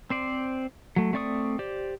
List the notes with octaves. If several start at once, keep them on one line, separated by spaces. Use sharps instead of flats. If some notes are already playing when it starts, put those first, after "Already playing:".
C4 C5 D5
F#3 A3
A3 C4 D5 C#6 D#6
G4 C5 D5